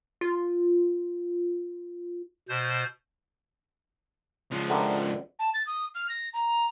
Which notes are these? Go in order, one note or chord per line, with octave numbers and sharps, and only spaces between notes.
F4
B2 C5
C#2 F3
D2 D3 D#3
A5
A6
D#6
F6
A#6
A#5